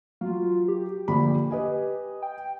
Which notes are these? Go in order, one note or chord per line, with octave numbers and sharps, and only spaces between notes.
F#3 F4
G4
A#1 D3 B5
B4 D#5 G#5
G5